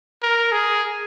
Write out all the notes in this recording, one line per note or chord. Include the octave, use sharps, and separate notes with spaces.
A#4
G#4